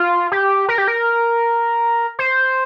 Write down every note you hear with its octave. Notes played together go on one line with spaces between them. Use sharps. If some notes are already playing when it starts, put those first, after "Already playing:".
Already playing: F4
G4
A#4
G4
A#4
C5